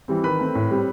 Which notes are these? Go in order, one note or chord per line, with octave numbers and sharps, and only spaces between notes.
E3 G3 C4
D#3 B4 B5
A3 C4
A2
G3 C4